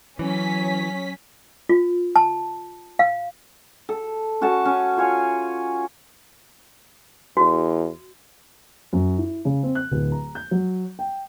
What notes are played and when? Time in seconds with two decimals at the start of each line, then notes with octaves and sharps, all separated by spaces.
0.19 E3 F#3 C#4 B6
1.69 F4
2.16 A5
2.99 F5
3.89 A4
4.41 C#4 F#4 A4 A5
4.65 C#4
4.97 F4 C#5 G#5
7.37 E2 F#4
8.93 F#2
9.19 E4
9.45 C#3
9.63 C4
9.75 F#6
9.91 D1
10.12 A#5
10.35 G6
10.51 F#3
10.99 G5